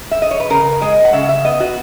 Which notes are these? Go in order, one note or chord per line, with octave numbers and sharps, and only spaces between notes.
E5
D#5
C#5
B4
C#3 A#4
G#3 D#5
F#5
C#3 E5
E5
B3 D#5
F#4